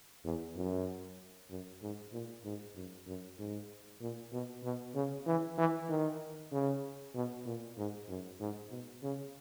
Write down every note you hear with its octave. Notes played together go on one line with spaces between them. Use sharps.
E2
F#2
F#2
G#2
A#2
G#2
F#2
F#2
G#2
A#2
B2
B2
C#3
E3
E3
D#3
C#3
B2
A#2
G#2
F#2
G#2
B2
C#3